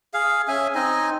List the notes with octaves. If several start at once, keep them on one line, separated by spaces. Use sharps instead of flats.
G#4 F5
C#4 G#4 E5 G#5
C4 D#4 D#5 G#5